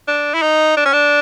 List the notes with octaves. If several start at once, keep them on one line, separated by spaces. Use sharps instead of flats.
D4
E4
D#4
D4
C#4
D4